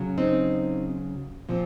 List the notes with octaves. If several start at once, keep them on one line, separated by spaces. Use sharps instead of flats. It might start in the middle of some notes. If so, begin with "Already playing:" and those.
Already playing: C#3 F#3
C4 D#4
A#2 F3 C4